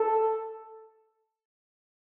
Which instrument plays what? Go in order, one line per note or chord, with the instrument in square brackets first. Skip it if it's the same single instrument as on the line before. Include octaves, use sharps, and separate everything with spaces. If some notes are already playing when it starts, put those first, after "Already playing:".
Already playing: [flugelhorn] A4